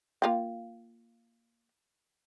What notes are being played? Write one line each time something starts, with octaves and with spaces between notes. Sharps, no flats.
A#3 F4 G5